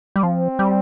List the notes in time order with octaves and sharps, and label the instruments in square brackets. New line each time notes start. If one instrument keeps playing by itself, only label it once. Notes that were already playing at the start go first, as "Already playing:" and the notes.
[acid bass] G3
[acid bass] F3 [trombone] C4
[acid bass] G3